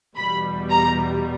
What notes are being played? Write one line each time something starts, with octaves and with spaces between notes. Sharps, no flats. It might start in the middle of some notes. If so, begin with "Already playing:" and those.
E2 B2 G3 B5
A#5